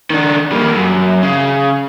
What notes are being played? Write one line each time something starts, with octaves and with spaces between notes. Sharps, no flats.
D#3 D4
G3 A#3
F#2
C#3